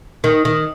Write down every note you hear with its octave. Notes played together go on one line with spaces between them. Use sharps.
D#3
D#3